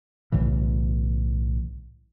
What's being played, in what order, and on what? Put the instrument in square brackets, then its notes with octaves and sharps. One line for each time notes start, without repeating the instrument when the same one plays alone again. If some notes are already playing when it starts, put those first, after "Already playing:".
[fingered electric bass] B1 A2 C#3 E3